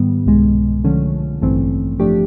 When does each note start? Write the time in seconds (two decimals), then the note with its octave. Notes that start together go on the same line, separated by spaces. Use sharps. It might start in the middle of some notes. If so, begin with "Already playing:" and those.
Already playing: G#2 D#3 G3 B3
0.26 C2 B2 G#3
0.84 D3 F3 A3 C#4
1.42 A1 G2 E3 A3 C4
2.00 A2 F3 A3 D4 G4